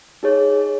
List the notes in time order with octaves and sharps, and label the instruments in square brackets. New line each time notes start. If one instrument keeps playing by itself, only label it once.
[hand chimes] D#4 G#4 C#5